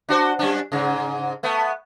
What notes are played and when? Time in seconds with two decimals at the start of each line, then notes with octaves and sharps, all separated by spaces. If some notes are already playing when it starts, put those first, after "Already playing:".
0.09 D4 F#4 C5
0.39 G3 C#4 D4
0.72 G#2 C#3
1.43 A3 B3